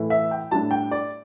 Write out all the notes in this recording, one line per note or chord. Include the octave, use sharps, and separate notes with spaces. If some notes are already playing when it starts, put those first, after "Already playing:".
Already playing: A2 E3 A3 E4
E5
G5
A2 G3 D4 A5
G5
D5